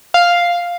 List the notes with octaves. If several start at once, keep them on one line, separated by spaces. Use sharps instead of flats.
F5